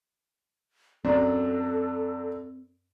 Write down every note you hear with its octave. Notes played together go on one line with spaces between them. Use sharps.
F#2 F#3 C4 D4 A4